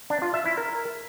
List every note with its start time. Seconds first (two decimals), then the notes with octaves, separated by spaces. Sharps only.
0.10 D4
0.22 F4
0.34 E5
0.46 E4
0.57 A#4